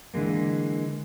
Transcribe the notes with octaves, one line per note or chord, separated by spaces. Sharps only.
D3 E3 G#3 A#3